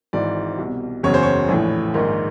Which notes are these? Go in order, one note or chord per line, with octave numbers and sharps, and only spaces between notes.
G#1 G#2 E3 D5
C2
B2
F#1 E2 C#3 C#5
C5
C#5
A#1 A2 E3
A#1 G#2 D#3